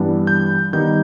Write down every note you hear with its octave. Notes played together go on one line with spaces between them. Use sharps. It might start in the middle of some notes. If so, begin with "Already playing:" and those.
Already playing: G2 E3 G3 B3 D4
G6
D#3 G3 B3 D#4 G6